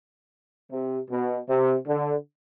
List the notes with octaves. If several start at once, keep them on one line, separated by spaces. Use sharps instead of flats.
C3
B2
C3
D3